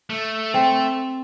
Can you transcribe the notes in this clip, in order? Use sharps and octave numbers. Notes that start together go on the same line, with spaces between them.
A3
C4